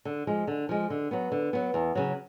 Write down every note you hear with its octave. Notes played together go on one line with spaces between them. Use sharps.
D3
F3 G#3
D3
F3 G#3
D3
F#3 B3
D3
F#3 B3
E2
C#3 F#3